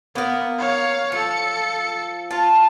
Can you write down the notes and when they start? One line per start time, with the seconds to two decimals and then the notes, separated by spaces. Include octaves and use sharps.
0.15 A#3 B3 A#4
0.59 C#5 F5
1.12 F3 A4 C#7
2.31 F4 A5